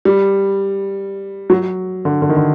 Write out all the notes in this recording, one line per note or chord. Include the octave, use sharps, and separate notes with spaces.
G3
F#3
D3
D3
D#3
D3